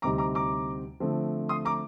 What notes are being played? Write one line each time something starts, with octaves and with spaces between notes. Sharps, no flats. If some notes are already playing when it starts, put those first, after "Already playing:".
D2 C3 G3 C4 D#4 A#5 D6
A#5 D6
A#5 D6
D3 F3 A3 C4
C6 D#6
A#5 D6